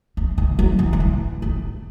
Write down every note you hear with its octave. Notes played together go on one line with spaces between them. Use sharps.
C#4
D#3
F#3
E3
D#3
E3
D#3